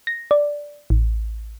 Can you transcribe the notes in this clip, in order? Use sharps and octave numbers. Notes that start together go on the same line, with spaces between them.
A#6
D5
A1